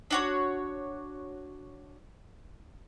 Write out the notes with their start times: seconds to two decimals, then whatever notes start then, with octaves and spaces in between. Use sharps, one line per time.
0.11 D4 F#4 C#5